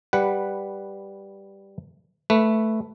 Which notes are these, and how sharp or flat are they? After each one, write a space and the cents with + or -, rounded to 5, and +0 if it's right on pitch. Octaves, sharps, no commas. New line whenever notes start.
G3 +0 B4 +0 F#5 +0
A3 +0 B4 +0